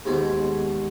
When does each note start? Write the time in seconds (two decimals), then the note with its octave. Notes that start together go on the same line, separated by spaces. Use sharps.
0.05 D#2 G#2 B2 G#5